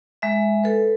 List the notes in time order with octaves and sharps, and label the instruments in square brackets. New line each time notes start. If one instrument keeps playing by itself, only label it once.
[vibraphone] G#3 E5
A4 B4